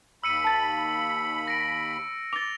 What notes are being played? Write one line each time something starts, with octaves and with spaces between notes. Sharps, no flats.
D#2 B5 E6 C#7 D#7
A5 A6
A#6 D7
D6 A6 F7 G7